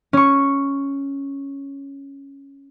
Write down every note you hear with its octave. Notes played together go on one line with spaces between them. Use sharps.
C#4 C#6